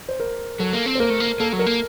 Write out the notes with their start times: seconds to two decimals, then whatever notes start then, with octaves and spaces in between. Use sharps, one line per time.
0.09 C5
0.20 A#4
0.59 F#3 A4
0.73 A#3
0.86 C4
0.95 C5
0.99 A#3 A#4
1.10 A3
1.20 A#3
1.40 A#3 A4
1.53 F#3
1.59 A#4
1.67 A#3